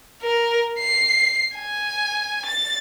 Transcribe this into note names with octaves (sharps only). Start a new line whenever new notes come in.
A#4
C7
G#5
A6